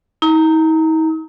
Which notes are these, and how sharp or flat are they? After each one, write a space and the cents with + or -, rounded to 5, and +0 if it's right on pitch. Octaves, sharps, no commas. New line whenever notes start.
D#4 +45 A#5 -15